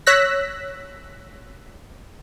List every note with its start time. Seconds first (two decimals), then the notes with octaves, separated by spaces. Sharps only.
0.07 C#5 E6 F#6 A#6 B6